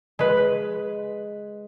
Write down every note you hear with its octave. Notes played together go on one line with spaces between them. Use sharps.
G#3 B4